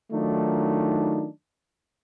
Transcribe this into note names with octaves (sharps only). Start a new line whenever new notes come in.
D#3 F#3 A3 D4 D#4 F4